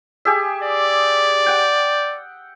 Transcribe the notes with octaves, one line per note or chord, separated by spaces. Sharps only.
G4 G#4 E5
D5
F#5 G5